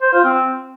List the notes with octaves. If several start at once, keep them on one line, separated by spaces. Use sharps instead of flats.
C5
F4
C4